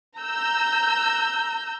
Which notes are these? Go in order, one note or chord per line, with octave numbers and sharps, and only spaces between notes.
A#5 E6 G6